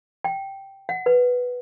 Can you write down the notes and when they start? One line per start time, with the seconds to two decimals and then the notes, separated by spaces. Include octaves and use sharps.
0.24 G5
0.89 F#5
1.06 B4